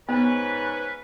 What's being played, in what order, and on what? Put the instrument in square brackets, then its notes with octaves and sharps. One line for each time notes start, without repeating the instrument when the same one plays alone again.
[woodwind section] G#2 C#4 B4 [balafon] B3